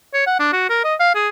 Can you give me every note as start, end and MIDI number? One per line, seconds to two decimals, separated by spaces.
0.14 0.25 73
0.27 0.38 78
0.40 0.48 62
0.53 0.69 66
0.70 0.82 70
0.84 0.95 75
1.00 1.12 77
1.15 1.29 68